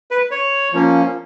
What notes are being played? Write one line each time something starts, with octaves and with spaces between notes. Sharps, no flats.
B4
C#5
F3 A#3 C#4